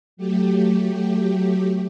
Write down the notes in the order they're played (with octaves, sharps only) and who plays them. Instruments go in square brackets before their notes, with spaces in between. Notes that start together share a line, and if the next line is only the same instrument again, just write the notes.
[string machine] F#3 A3 G4